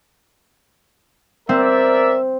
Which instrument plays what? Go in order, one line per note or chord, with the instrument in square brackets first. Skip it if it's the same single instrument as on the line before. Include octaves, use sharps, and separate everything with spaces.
[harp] C4 [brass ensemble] A#4 D5 E5